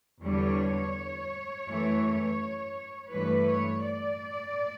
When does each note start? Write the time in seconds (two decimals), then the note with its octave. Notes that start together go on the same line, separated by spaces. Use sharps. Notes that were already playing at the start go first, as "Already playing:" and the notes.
0.24 E2 D3 G3 C#5
1.68 F#2 E3 A3
3.10 G2 E3 A3 B4
3.47 C#5
3.82 D5